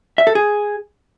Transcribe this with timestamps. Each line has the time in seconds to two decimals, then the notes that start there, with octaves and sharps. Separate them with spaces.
0.18 E5
0.27 A4
0.35 G#4